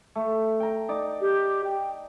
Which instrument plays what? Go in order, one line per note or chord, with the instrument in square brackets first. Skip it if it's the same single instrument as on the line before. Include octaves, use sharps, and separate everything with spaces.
[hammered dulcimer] A3
G5 A#5
D#4 D5
[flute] G4
G5